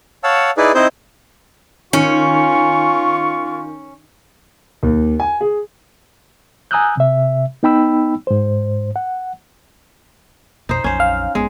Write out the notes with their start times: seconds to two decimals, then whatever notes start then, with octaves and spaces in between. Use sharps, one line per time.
0.24 C#5 F5 F#5 A5 E6
0.57 D#4 E4 G#4 B4 D5
0.75 C4 D#4 E4 C5 D#5 G6
1.93 D#3 C#4 F4 C#6
4.83 D#2
5.20 G#5
5.41 G#4
6.71 G#5 A#5 D#6 E6 F#6 G6
6.97 C3 E5
7.63 B3 D#4 G5 B5 E6
8.27 G#2 C5
8.96 F#5
10.69 A#1 F2 B2 D#4 C5
10.84 A#1 F2 F#3 C#4 C5
11.00 F5
11.35 F1 F2 G#3 B3